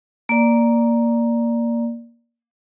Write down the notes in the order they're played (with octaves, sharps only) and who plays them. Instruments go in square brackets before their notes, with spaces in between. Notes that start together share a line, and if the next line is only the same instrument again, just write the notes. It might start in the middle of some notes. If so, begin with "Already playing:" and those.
[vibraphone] A#3 D5